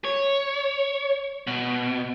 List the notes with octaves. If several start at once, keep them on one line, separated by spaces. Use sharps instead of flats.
C#5
B2